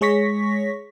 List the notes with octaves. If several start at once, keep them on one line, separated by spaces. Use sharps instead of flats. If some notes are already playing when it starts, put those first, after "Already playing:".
G#3 G#4 C#5 C#6 A#6 B6